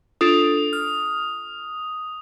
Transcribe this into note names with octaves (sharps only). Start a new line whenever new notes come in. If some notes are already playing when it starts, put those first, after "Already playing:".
D4 F4 A4 D#6
F6